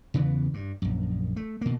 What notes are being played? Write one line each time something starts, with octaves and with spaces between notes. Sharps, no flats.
E2 C#3 E3 B3
G2
A#1 F#2
A3
B2 A#3